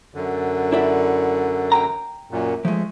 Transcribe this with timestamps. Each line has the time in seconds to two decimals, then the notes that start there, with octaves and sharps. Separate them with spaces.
0.15 F#2 D3
0.72 E4 D5 E5
1.72 G5 G#5 A#5
2.31 F#2 A#2
2.65 F3 G#3 A3